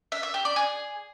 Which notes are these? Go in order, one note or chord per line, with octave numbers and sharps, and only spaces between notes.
E5
E5
G4
D5
G#4